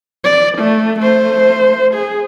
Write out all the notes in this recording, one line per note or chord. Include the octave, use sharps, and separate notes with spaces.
D5
A3
A3 C5
G#4